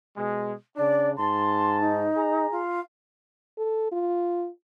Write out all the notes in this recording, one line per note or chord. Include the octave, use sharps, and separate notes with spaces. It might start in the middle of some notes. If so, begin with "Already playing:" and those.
B2 G#3
C#3 D4 D5
G#2 A5 C6
D#4
G#4 A#5
F4
A4
F4